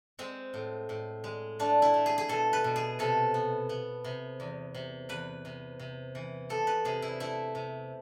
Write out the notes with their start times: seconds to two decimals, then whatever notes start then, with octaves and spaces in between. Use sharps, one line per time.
0.19 G#3 C4
0.54 A2
0.89 A2
1.24 G#3
1.59 A3 D4
1.82 E4
1.94 A3
2.06 G#4
2.18 G#4
2.29 B2 A4
2.53 B4
2.64 B2
2.76 G#4
2.99 C3 A4
3.34 B3
3.69 B3
4.04 C3
4.40 E2
4.74 C3
5.09 E2 B4
5.45 C3
5.79 C3
6.15 E3
6.49 B3 A4
6.67 B4
6.85 C3 G#4
7.02 E4
7.20 A3 E4
7.55 C3